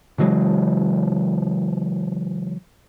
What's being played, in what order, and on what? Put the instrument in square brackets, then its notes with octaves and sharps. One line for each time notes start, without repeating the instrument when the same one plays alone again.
[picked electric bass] C#3 E3 F#3 G#3